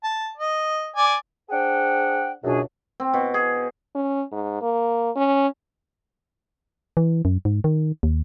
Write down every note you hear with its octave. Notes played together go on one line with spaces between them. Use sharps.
A5
D#5
D5 G#5
D4 G#4 C5 F#5 G5
C#2 F#2 B2 D4 G#4
C4
B2
G#4
C#4
G#2
A#3
C#4
E3
F#2
G#2
D#3
D#2